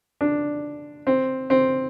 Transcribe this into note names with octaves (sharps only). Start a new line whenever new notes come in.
D4
C4
C4